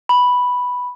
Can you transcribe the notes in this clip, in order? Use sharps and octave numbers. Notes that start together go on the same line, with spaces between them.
B5